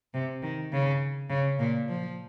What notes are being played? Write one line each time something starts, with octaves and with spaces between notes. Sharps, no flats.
C3
D#3
C#3
C#3
A#2
F3